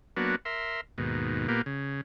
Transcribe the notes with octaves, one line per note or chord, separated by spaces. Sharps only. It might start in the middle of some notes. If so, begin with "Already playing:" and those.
F#3 A#3 B3 D4 F#4
A#4 E5 C6
D#2 G#2 B2
A#2 A#3 B3 G4
C#3